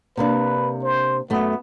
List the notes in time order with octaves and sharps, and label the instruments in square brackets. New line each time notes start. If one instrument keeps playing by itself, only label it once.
[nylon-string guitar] C3 A#3 D4 [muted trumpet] B4
[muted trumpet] C5
[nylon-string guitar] F#2 A3 [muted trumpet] B3